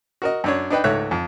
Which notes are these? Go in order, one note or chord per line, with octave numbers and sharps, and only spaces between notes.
F#4 A#4 D#5
F#2 D4 C#5
D4 D#4 B4 G5
C#2 G#2 A3 C#5 E5 F#6
F2